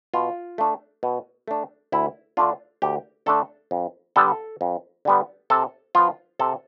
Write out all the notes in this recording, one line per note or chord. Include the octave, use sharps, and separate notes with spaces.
B2 F4
A3 D4
B2
A3 D4
D2 E4
D3 A3 D4 F4
D2 G4
D3 A3 D4 A4
F2
D3 G3 B3 A4
F2
D3 G3 B3
C3 A4
F3 B3 F4
C3 A4